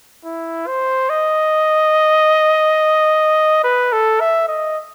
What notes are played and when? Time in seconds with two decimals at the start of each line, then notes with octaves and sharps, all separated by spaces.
0.25 E4
0.67 C5
1.10 D#5
3.64 B4
3.93 A4
4.20 E5
4.48 D#5